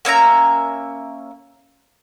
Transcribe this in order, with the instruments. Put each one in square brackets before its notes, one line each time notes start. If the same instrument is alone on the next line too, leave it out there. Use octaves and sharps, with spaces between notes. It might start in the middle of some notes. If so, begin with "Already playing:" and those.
[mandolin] A#3 C#4 E5 A#5